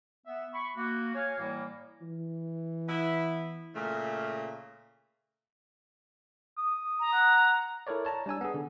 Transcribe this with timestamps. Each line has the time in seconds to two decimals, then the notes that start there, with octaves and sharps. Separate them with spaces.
0.26 B3 E5
0.54 B5 C#6
0.77 A#3 F#4
1.15 C#5 F5 G#5
1.39 A2 E3 G3 A#3
2.02 E3
2.89 B3 E4
3.75 A#2 C#3 A3
6.58 D#6
7.00 A#5
7.13 F#5
7.87 E4 A4 A#4 C#5 D5
8.05 C#5 A5 A#5
8.26 G3 D4 G#5 E6
8.41 B3 G#4
8.54 D3